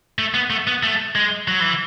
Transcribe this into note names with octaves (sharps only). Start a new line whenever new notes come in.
A3
B3
A3
B3
A3
G#3
F#3
E3